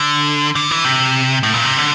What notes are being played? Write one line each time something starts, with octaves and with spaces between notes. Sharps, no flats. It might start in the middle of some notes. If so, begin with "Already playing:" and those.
Already playing: D3
D3
E3
C3
A2
A#2
C3
D3